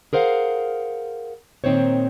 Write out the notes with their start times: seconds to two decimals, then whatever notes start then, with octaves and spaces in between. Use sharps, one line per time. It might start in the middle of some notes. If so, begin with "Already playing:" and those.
0.13 G#4 A#4 C5 F5 F#5
1.64 A#2 D#3 C4 D#4 C5 C#5